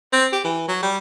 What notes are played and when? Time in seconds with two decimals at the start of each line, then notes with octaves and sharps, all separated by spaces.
0.13 C4
0.33 G4
0.44 E3
0.68 F#3
0.83 G3